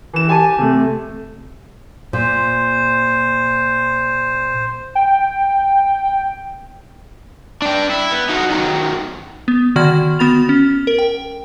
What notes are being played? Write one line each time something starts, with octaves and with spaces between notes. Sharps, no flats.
E3 E7
G4 G#5 A5 D#7
C3 A3
A#2 C5
G5
D4 G5
E4
B3
D#4 F#4
D#3 F#3
B3
D3 D#3 F#4 D5 F6 G#6
B3 F#4 B5 A6 F7
C#4
A#4
G5